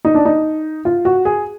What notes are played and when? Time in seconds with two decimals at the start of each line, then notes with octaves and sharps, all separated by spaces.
0.05 D#4
0.14 D4
0.25 D#4
0.85 F4
1.05 F#4
1.25 G#4